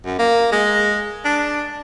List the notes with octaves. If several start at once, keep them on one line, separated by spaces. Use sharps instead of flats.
F#2
A#3
G#3
D4